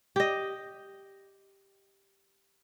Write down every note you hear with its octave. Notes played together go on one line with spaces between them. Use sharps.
G4 D#5